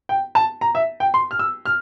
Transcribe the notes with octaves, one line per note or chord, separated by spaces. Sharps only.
G5
A5
A#5
E5
G5
C6
F6
E6
F6